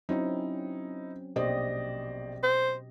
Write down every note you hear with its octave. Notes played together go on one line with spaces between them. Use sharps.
F#3 C4 C#4 D#4 E4
A#1 B2 G4 C5 D5 D#5
C5